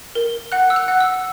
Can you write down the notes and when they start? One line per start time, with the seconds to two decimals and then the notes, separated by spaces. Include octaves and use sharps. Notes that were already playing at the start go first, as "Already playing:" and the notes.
0.15 A#4
0.52 F#5 F#6
0.70 E6
0.76 F#6
0.88 F#5
1.01 E6